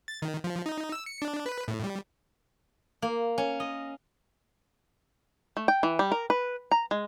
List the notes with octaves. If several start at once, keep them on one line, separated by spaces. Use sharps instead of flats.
A6
D#3
F3
D#4
E6
C#7
D4
B4
A2
G3
A#3
C#4
D#5
A3
G5
E3
G3
A#4
B4
A#5
G#3